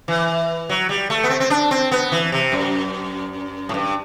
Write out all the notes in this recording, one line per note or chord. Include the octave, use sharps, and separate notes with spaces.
E3
F#3
G3
A3
B3
C4
C4
D4
C4
B3
E3
C3
F#2
A2
G2